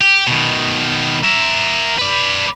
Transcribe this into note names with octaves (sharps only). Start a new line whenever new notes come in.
G4
B2 D#3
A#4 E5
B4 D5